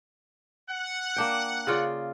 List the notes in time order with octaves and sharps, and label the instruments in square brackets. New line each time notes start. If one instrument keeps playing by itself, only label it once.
[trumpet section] F#5
[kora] A#3 D4 G5
C#3 F4 D5